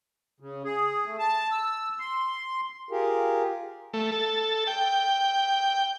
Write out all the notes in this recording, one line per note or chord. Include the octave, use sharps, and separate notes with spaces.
C#3
G#4
A3
A5
E6
C6
F4 G4 G#4 A#4
A3
A4
G5